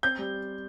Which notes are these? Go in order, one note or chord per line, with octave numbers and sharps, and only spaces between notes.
C4 G6
G3